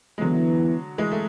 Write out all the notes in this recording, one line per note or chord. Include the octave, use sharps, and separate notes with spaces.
G#3
D3 E3 F#3 B3 E4
E3 G#3
A3